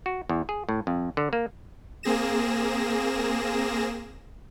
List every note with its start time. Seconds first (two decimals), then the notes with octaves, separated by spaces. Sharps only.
0.06 F#4
0.29 E2
0.49 G#4
0.69 A2
0.87 F2
1.17 D3
1.33 A#3
2.03 A#3 C4 G#4 A#6 E7